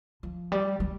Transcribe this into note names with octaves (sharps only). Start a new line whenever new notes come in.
F3
G3
G3